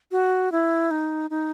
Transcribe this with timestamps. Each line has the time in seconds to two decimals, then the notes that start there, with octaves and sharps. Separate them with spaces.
0.12 F#4
0.52 E4
0.91 D#4
1.30 D#4